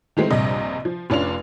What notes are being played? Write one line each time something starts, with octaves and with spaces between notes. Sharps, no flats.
D#3 E3 G#3 A3 C4
A#1 G2 C3 D#5
F3
F1 C#4 D4 F4 F7